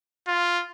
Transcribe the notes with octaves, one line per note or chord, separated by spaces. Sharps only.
F4